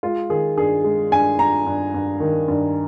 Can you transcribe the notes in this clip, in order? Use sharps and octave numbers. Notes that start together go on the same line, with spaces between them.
G#3 F4
D#3 G#4
G2 G#4
G#3
G2 G#5
G2 A#5
G2
G2
D#3
G2